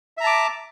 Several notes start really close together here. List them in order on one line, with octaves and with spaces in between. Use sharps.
E5 A#5 A5 D6